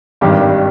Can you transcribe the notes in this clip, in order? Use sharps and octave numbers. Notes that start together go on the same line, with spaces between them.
G#1 G2 D#3 G3 G4